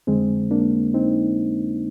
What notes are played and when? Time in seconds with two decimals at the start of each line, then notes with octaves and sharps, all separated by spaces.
0.07 F2 D3 G#3 C4
0.51 A#3 D4
0.94 C4 D#4